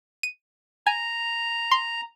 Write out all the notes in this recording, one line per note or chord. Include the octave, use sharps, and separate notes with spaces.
D#7
G#5 A#5
C6